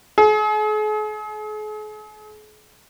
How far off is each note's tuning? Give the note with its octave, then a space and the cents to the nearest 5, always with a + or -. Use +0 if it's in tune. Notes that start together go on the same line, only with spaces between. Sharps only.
G#4 +45